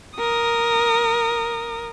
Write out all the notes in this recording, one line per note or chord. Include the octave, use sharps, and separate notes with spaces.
A#4 D#6